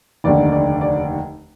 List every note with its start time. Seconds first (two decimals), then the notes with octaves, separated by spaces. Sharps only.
0.24 F1 D#2 D3 D5
0.52 D5
0.81 D5